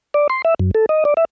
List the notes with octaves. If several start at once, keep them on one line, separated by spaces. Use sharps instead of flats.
D5
C6
E5
F#2
A4
D#5
D5
E5